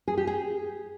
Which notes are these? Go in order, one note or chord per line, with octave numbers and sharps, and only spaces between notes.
G#4
G4
G#4